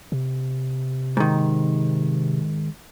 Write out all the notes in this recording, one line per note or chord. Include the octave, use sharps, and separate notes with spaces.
C3
G#2 D#3